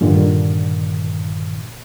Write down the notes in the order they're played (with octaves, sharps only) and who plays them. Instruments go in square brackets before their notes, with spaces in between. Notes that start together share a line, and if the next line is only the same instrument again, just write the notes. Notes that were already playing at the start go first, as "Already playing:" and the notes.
[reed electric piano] G2 A#2 D3 D#3